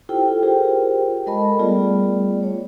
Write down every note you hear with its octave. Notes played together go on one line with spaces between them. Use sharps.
E4 F4 G4 A4 C5 G5
F4 G4 G#4 A#4 C5 G5
G#3 A4 A#4 D#5 A5 B5
G3 A3 B3 F4 G#4 D5
C#5